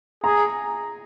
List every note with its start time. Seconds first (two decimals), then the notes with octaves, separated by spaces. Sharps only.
0.24 G#4 A#5